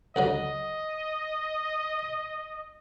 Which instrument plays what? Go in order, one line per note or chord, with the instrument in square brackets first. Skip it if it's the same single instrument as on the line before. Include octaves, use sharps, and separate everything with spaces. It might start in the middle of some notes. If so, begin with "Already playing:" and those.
[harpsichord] C#2 D3 F#3 [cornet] D#5